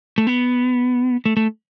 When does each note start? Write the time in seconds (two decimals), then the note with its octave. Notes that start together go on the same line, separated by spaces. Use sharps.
0.18 A3
0.27 B3
1.26 A3
1.37 A3